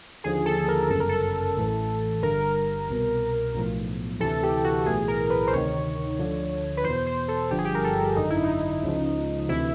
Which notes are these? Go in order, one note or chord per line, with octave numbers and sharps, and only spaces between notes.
D#2 D3 F3 G#4
A4
A#4
G1 F#2 C#3 A4
A#4
A4
A1 A2 E3
G1 G2 D3 A#4
C2 B2
B1 A2 F3
D2 C3 E3 A4
G4
F#4
B1 A2 E3 G#4
A#4
B4
C5
D2 C3 D#3 C#5
D2 D3 F3
B4
E2 B2 C5
C5
A4
G1 G2 D3 F3 G4
G#4
G4
A#4
A4
G#1 F#2 D3 D#4
E4
D#4
C#2 C#3 F3
D2 C3 E3 E4